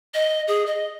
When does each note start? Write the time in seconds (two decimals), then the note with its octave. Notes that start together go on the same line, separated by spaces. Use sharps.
0.14 D#5
0.48 G#4
0.66 D#5